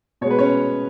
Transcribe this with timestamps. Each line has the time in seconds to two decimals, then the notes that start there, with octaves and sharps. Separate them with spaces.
0.21 B2 G#3 C#5
0.31 B4
0.39 C#4 C#5